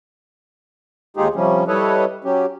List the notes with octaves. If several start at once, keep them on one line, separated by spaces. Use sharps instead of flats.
D#2 G#3 D#4 F4 G4 G#4
C3 F3 G3 C#4
G3 E4 A4 B4 C#5 D#5
F#3 C#4 G4